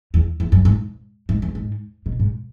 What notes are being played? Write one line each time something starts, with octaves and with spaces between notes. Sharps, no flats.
E2
E2
F#2
G#2
G#2
E2
G#2
B2
G#2